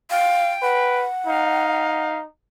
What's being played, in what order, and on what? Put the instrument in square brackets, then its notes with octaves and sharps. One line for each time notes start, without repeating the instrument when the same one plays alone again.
[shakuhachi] F5 [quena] G5
[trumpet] B4 [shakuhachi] F#5
[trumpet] D#4 [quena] F5